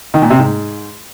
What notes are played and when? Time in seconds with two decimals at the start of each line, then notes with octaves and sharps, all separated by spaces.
0.14 D#3
0.22 A#2
0.30 C3
0.39 G#2